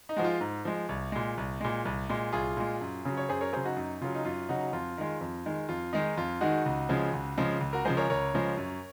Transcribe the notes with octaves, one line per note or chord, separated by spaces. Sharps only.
D#4
F3 G#3 F#4
F4
G#2
F3 G#3
C2
A#2 G#3
C2
A#2 G#3
C2
A#2 G#3
C2 F4 G#4
A#2 G#3
F#2
C#3 F#3
C#5
F#2 G#4 C5
A#4 C#5
C#3 F#3 G#4 C5
D#4 F#4
F#2 D#4
C#3 F#3 F4
D#4
F#2 F4
C#3 F#3 D#4 F#4
F2 F4
D#3 G#3
F2
D#3 G#3
F2 F4
D#3 G#3 D#4
F2 F4
D#3 G#3 D#4 F#4
C#2
C#3 F3 G#3
C#2
C#3 F3 G#3
C#2
F#4 A#4
C#3 F3 G#3 G#4 C5
A#4 C#5
C#2 A#4 C#5
C#3 F3 G#3
F#2